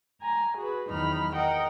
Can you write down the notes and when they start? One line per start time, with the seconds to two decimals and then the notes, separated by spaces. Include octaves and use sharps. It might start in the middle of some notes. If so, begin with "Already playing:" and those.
0.21 G#5 A#5
0.56 F#4 G#4 B4
0.88 E2 D#3 F#3 D#4 B5 F6
1.34 A#4 D#5 F#5 G5